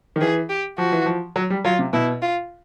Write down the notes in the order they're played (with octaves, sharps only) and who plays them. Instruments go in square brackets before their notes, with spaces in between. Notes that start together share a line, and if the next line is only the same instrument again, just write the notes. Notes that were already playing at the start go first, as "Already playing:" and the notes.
[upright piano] D#3
[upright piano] E3 [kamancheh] G#4
[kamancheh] G4
[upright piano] F3 [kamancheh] F#4
[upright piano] E3
F3
F#3
G3
[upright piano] F#3 [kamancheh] F4
[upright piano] C3
[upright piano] B2 [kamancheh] E4
[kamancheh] F4